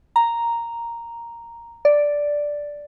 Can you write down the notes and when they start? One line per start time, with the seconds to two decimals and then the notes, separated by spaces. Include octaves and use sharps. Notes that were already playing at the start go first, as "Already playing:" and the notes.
0.16 A#5
1.85 D5